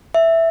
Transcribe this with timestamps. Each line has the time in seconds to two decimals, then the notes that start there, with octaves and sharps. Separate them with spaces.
0.14 E5